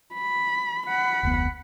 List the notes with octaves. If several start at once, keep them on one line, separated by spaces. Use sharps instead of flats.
B5
F#5 B5
F1 D2 B3